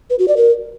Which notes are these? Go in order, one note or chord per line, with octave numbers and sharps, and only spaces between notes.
B4
F#4
D5
A#4